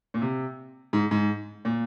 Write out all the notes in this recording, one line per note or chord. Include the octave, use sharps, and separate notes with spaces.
A#2
C3
G#2
G#2
A#2